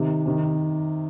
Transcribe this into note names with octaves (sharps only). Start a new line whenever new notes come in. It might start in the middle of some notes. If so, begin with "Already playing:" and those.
Already playing: C3 D#3
C3 D#3